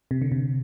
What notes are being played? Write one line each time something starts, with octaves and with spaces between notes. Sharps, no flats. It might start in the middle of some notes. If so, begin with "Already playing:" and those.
C3
D3
C3